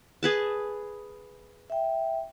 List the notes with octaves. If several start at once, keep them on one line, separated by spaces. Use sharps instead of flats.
G#4 B4 A5
E5 G5